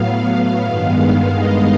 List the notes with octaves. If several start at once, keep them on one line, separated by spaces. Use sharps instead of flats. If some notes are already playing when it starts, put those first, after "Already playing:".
Already playing: A2 F#3 B3 F5
G2 D#3 G#3 B3
D#5